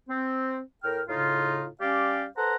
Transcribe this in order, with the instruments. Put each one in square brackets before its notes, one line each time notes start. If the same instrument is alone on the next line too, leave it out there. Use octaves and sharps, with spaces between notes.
[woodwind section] C4
A2 A#4 G5 F6
A2 C#3 D#4 F4
G3 C#4 G4 D5 F5
A4 B4 C5 F#5 A#5